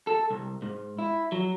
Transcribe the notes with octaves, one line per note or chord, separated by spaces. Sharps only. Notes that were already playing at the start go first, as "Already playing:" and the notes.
A4
C2
G#2
E4
F#3